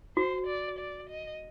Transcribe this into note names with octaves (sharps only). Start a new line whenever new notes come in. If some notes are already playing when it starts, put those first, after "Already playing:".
F#4 C5
D5
D5
D#5